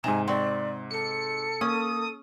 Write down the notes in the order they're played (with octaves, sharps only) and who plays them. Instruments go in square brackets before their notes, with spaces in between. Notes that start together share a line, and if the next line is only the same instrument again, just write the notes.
[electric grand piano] G#2 D#4 E7 [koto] C3 A#5 [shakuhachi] G#5
[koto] C4 F#4 [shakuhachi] D5
[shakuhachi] A4 [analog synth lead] C#7
[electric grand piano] A#3 [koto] C#4 [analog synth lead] D#6